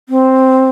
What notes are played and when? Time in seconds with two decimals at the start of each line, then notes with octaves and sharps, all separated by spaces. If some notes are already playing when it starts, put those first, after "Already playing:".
0.09 C4